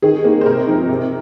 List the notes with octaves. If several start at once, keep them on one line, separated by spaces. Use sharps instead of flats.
D#3 G#4
A#3 D#4
C5
C3 A#4
F3 C4 D#4
C3